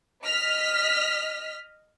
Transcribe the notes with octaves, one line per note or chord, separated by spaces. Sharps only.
D#5 F6 B6